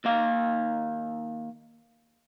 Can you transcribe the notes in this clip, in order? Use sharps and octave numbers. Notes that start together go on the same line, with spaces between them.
D#2 A#3 F5